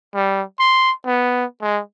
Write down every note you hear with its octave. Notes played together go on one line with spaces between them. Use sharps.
G3
C6
B3
G#3